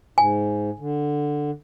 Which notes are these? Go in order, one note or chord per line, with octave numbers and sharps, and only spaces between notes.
G#2 G#5
D3